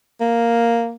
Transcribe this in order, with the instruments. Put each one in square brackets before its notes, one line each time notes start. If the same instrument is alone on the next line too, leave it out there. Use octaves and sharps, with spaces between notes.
[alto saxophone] A#3